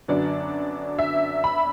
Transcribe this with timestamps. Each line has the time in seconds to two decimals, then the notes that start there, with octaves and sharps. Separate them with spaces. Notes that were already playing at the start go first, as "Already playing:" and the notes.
0.08 F#2 D3 F#3 B3 D4 D5
0.99 E5
1.44 B5